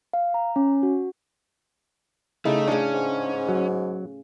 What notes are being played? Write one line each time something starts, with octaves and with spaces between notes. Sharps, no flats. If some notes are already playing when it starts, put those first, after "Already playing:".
F5
A#5
C#4
F#4
C#3 A3 D#4 E4
A2 C#3 C#4 D4
G#2
F#3